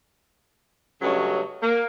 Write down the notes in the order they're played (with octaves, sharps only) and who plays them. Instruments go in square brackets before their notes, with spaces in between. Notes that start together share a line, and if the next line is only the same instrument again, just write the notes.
[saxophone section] G2 C#3 F#3 A3 C#4 D#5
A#3